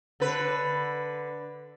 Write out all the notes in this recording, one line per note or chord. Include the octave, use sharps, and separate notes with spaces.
D3 B4